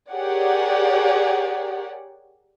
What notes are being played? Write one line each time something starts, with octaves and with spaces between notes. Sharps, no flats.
G4 G#4 A#4 C#5 D5 F#5